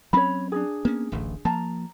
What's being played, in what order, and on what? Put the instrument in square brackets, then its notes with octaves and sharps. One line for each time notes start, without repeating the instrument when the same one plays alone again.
[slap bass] F#3 C4 C#4 [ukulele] C#5 B5
[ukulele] D4 D#4 G#4
[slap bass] A#3 B3 C#4
D1 A1 A2
[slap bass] F3 A#3 [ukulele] A5 A#5